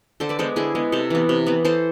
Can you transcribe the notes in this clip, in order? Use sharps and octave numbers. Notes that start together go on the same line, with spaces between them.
D3 A4 C5
B4 D5
G#3 B3 A4 C5
D3 E4 G#4
G#3 B3
C3 A4 C5
E3 B3
C3
E3 B3
E3 A4 C5